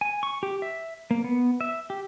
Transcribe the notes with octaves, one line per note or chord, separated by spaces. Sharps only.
G#5
C#6
G4
E5
A#3
B3
E5
G4